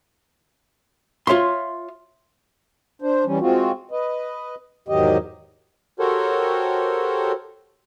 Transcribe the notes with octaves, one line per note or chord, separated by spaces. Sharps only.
F4 C#5 E5 C6
D4 C5
E3 G3 C#4
G#3 C4 F4 F#4
B4 D#5
E2 G#2 D#3 F#3 G4 D#5
F#4 G4 A4 A#4 C5 C#5